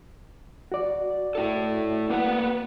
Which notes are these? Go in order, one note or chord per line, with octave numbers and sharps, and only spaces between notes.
F#4 D5
E4 A4
A#3 B4 F#5